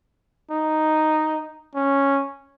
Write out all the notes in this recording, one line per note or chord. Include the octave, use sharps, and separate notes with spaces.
D#4
C#4